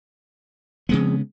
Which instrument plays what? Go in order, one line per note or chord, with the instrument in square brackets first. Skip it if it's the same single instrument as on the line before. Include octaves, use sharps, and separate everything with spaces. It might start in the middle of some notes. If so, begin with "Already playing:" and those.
[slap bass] C#3 G#3 B3 [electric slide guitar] F3 C4 G#4